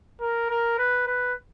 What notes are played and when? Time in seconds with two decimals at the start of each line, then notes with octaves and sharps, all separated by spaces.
0.21 A#4
0.50 A#4
0.79 B4
1.07 B4